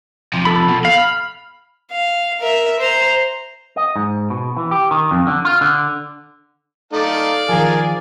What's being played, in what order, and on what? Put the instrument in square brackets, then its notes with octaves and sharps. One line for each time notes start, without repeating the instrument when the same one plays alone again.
[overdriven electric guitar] C3 F3
[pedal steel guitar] A4 B5
[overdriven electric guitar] B2
[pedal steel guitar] F5 [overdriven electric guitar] B5
[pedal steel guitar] F6
[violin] F5
A#4 E5
C5 A#5
[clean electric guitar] D#5
G#2
B2
E3
G4
D#3
F2
D3
F4
D3
[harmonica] A3 D#4 [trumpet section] D5 F5
[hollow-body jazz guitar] D#3 F3 [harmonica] G#4 A#4 [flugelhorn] G#5